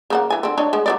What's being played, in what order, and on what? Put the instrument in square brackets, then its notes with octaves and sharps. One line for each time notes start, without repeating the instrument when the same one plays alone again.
[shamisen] C#3 A#3 F#5
E3 G#5
D3 C4
D4 C#5 D#5
G#3 B3
F#3 D4 D5